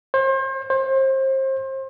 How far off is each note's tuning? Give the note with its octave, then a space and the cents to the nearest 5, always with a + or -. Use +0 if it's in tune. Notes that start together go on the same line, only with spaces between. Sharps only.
C5 +35
C5 +30